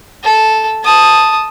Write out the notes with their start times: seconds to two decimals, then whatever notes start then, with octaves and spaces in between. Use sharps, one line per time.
0.24 A4
0.83 A5 D#6